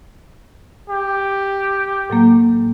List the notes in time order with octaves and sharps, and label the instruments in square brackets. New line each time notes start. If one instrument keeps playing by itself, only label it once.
[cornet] G4
[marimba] A2 F#3 A#3